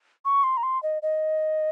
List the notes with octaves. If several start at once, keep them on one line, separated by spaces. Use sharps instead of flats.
C#6
C6
A#5
C6
D#5
D#5